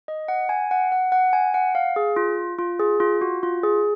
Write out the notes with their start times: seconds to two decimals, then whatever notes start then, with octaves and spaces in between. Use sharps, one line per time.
0.08 D#5
0.28 F#5
0.49 G#5
0.71 F#5
0.92 F#5
1.12 F#5
1.33 G#5
1.54 F#5
1.75 F5
1.96 G#4
2.16 F4
2.59 F4
2.79 G#4
3.00 F4
3.21 F#4
3.43 F4
3.63 G#4